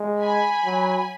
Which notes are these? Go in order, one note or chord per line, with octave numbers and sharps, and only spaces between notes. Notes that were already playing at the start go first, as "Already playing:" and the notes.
Already playing: G#3
G#5 B5
F#3